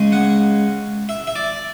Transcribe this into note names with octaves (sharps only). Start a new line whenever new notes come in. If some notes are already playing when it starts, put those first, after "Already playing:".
Already playing: C#3 G#3 C#4
F#5
E5
E5
D5